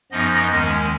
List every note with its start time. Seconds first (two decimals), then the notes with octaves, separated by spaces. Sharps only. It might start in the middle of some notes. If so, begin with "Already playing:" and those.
0.11 F#2 F3 B3 D#4 D#5
0.49 D#2 D#3 G#3 C#4